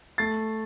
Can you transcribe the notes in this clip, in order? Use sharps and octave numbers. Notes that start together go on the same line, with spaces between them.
A3 A6 C7